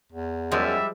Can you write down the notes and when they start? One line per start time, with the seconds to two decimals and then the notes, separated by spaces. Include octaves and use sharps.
0.12 E2
0.52 F#2 F3 G3 G#3 E5